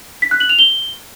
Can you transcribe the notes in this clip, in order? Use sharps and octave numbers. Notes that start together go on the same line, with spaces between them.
B6
F#6
F#7
F7
G7